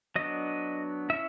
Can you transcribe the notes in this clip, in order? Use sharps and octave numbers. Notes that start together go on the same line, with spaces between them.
F#3 B3 D4 D#5
C#4 E4 E5